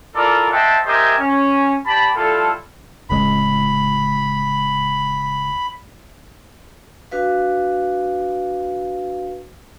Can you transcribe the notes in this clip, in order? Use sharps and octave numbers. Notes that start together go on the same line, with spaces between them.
E4 F4 A4 A#4 D5
C5 D#5 E5 F#5 G5 A5
G4 A#4 C5 D#5 E5 G#5
C#4
G4 D5 A5 B5
G3 E4 F4 A4
D1 C#2 G#3 B5
D4 F#4 B4 F5